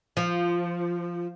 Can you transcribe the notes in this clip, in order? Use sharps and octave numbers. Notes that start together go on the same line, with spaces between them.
F3